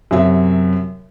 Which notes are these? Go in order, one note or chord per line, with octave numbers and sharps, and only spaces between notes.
F#2 C3 F#3 E5